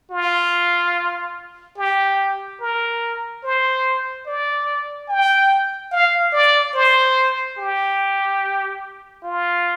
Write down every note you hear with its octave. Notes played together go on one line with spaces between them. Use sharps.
F4
G4
A#4
C5
D5
G5
F5
D5
C5
G4
F4